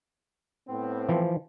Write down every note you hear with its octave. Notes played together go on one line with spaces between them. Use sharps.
A2 B3 C4
E3 F3